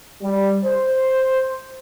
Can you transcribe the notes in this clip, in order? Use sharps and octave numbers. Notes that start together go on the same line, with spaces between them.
G3
C5